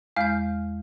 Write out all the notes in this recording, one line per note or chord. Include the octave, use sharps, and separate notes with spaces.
E2 G#3 F5 F6 G6